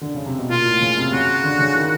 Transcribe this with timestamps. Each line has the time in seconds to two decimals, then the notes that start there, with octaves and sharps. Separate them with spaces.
0.01 D3
0.15 C#3
0.26 C3
0.39 B2
0.50 A#2 F4
0.66 A2
0.81 C#3
0.97 C3
1.13 C#3 F#4
1.44 D3
1.59 C#3
1.75 D#3